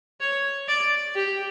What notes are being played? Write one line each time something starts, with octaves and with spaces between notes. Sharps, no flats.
C#5
D5
G4